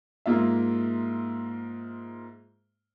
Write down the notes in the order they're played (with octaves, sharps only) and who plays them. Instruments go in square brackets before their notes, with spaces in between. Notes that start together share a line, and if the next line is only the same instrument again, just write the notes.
[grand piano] G#2 A#3 F4 E5